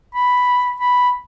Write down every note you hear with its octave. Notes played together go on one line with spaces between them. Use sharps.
B5
B5